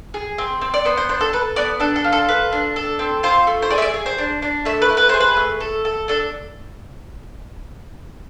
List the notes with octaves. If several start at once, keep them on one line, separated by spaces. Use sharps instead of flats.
G#4
C4
C4
D5
B3 C5
C5
D4 C5
A4
A4 B4
B3 D5
D4 A4
A4
F4
A4
A4 B4
D4
A4
C4
F4 C5
A3
C5
G#4 D5
E5
D5
G#4
C5
D4
D4
A3 E5
B4
E4
B4
G#4 C5
B4
A3
A4
A4
D4 A4